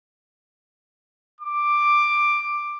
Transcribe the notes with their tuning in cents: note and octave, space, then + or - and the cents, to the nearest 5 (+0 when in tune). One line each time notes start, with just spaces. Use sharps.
D6 +10